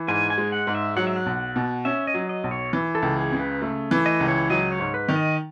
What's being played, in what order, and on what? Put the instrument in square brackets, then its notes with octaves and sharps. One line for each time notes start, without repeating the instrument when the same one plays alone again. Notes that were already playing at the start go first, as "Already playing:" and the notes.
Already playing: [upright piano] E3
[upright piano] G#2 [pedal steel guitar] G#5
[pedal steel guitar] G#5
[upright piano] G#3
[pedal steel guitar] F#5
[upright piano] G#2
[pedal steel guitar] E5
[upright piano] F#3 [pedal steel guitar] F#5
[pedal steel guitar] E5
F#5
[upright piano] B1
B2
[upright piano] C#4 [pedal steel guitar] E5
[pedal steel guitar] D#5
[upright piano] F#3
[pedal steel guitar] D#5
[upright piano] B1
[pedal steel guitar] C#5
[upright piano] E3
[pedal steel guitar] A4
[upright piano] C#2
[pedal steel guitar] G#4
[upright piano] C#3
[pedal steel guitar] B4
[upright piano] A3
E3
[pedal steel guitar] D#5
[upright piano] C#2
[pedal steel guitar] C#5
[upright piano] F#3 [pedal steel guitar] D#5
[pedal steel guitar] C#5
[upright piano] G#2
[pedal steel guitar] B4
[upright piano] D#3
[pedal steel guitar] D#5